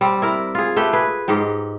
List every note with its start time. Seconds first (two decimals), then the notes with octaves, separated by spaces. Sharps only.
0.01 G3 C4
0.22 E4 A#4
0.55 F4 G#4
0.76 A3 G4 B4 G5
0.93 G#4 B4
1.28 G#2 D#4 G4